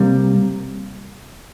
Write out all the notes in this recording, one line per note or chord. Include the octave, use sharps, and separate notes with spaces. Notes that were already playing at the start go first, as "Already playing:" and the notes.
Already playing: C3 G3 A#3